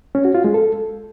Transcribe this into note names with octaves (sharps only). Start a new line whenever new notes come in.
C#4
F#4
F4
G#3
A4